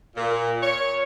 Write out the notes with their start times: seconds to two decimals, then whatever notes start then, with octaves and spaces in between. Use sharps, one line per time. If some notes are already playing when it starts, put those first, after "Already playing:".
0.16 A#2
0.62 C#5